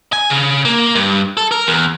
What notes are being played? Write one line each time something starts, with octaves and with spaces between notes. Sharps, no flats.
G#5
C#3
A#3
G2
A4
A#4
E2